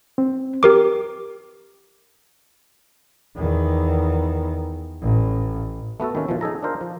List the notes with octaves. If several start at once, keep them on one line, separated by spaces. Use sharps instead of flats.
C4
G4 A#4 D6
E2 D#3
A1
A3 B3 F#4 A4
D#3 A#3 C#4
B2 E3 F3
D#4 G#4 A4 A#5
D4 D#4 F4 A#4 C5
F3